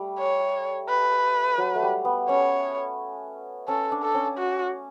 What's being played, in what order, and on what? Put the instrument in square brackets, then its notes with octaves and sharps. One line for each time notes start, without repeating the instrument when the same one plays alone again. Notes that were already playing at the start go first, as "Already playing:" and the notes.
Already playing: [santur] G3 A3
[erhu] C#5
B4
[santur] F#3
A3
G3
B3
[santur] C#4 [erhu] C#5
[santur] C#4 [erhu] A4
[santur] D4
[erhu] A4
[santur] C#4
[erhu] F#4